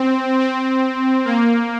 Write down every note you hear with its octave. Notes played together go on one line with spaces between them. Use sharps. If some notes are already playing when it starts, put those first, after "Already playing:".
Already playing: C4
C4
A#3